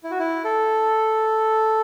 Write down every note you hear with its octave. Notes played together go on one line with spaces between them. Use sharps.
E4
F#4
E4
A4